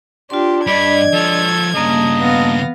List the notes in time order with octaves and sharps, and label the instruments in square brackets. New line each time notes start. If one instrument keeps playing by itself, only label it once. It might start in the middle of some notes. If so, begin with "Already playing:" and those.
[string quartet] D4 G4 [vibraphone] F4 C6
[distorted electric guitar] G2 [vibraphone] D4 D5 D#5 [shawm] B5 [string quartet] G#6
[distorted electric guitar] F3 C#5 [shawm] A4
[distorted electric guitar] G2 C#3 [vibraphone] A#3 A5 [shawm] D#5
[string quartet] B3 F5 A#6